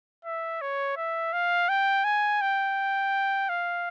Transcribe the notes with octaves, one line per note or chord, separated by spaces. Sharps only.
E5
C#5
E5
F5
G5
G#5
G5
F5